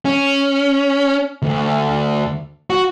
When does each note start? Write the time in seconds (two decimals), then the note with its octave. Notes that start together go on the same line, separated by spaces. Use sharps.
0.05 C#4
1.42 D2
2.70 F#4